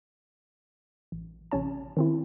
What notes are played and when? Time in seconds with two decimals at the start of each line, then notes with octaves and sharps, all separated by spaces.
1.12 A1
1.51 A1 C3 C#4 C#5 A5
1.97 D#3 C4 E4